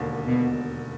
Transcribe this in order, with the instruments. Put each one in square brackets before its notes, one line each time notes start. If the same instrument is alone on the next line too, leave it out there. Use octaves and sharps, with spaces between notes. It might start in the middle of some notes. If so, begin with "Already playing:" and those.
Already playing: [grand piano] E1 D#2 D3
[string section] B2